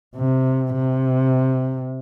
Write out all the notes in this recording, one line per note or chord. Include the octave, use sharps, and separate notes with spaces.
C3
C3